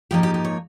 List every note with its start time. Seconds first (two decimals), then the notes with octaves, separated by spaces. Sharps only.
0.11 G#2 F3 A#3 D#4 G4
0.23 G4
0.34 G4
0.44 C#5